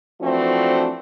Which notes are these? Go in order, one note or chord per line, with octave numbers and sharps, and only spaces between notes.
E3 F3 A3 C4 D4 F#4